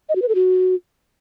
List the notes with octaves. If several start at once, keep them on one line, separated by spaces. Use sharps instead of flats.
D#5
F#4
B4
A4
F#4